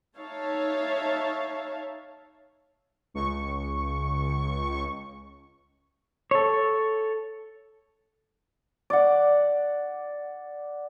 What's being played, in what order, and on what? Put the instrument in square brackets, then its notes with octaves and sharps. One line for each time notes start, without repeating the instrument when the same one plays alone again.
[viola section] D#4 C#5 E5 F5 A5
[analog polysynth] C#2 C#6
[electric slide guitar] A4 C#5
[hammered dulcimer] D5 F#5